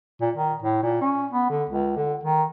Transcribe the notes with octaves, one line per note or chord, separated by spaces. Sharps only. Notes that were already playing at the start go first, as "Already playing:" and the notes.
A#2
D#3
A2
A#2
C#4
B3
D3
C#2
D3
D#3